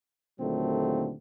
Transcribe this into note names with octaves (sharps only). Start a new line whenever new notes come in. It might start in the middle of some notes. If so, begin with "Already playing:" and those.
D#2 A#2 D3 F#3 A3 C4